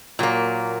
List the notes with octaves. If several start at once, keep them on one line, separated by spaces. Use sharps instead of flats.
A#2 F#3 A#3